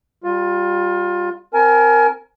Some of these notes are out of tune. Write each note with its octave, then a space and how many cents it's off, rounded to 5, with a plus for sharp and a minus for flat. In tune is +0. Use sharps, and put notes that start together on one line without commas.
G3 +0 F4 +25
C4 +0 A#4 +0 G#5 +30